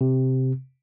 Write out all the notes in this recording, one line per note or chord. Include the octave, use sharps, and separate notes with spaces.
C3